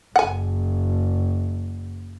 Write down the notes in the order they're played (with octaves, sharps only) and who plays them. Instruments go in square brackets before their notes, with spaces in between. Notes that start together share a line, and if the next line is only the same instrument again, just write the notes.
[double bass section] F#1 [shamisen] F#5 G#5